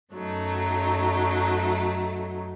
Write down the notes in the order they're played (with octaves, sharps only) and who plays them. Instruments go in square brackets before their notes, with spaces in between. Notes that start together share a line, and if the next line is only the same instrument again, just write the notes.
[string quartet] F#2 F#3 A3 D#4